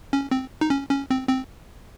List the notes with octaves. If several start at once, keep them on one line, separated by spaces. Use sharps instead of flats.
C#4
C4
D#4
C#4
C#4
C4
C4